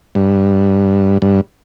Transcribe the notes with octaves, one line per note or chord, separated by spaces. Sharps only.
G2
G2